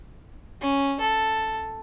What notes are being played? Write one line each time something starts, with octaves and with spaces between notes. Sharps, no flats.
C#4
A4